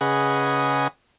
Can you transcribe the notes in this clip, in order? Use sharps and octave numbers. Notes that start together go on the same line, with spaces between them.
C#3 G#4 B4 D#5 F#5